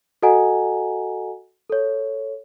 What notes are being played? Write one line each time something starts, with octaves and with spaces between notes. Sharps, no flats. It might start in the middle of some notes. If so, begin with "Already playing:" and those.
F#4 A4 D#5 F#5 G#5 A#5
A4 C#5